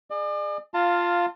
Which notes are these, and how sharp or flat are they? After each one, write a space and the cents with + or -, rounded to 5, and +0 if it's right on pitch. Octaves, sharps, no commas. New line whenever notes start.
G#4 +0 D5 +40
F4 +0 F5 +5 A5 +35